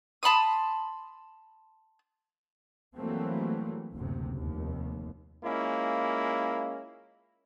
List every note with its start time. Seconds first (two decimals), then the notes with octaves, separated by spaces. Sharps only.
0.23 A5 B5 C6 D#6
2.96 E3 F#3 G3 A3 A#3 C4
3.94 F#1 D2 C3
4.39 F1 D#2
5.44 G#3 A#3 C#4 E4 F4